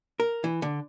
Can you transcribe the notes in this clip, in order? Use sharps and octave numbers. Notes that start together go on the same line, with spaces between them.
A#4
E3
D3